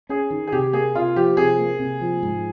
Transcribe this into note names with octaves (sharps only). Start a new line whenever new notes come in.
C#4 G#4
D#3
G#4
C3 G4
A#3 G#4
C3 F4
F3 G4
C3 G#4
A#3
C3
F3
G#2